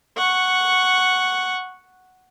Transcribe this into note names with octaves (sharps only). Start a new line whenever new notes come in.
F#5 C#6